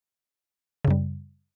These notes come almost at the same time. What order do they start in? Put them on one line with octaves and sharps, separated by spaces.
C#3 F#2 G3